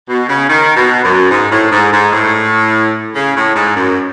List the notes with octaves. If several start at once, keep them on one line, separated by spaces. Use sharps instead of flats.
B2
C#3
D#3
B2
F#2
G#2
A2
G#2
G#2
A2
C#3
A2
G#2
F#2